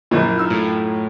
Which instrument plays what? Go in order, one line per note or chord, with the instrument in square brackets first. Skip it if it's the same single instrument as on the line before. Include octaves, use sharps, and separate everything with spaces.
[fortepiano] A#1 A#2 [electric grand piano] F#2 E4 F4
[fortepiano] D#4 E6 F6
[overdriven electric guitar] A2